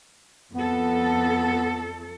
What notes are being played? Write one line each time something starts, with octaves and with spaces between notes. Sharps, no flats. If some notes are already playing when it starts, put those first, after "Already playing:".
F2 B3 A4